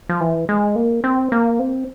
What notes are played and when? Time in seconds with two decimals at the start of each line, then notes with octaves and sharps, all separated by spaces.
0.09 F3
0.20 E3
0.49 G#3
0.76 A#3
1.04 C4
1.32 A#3
1.59 C4